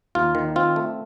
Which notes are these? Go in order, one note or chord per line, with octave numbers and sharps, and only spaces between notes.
D#2 F4
D#3
C4 F4
A3